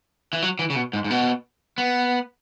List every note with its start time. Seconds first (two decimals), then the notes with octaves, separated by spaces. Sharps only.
0.33 E3
0.42 F#3
0.59 E3
0.70 C#3
0.75 B2
0.93 G#2
1.04 G#2
1.10 B2
1.78 B3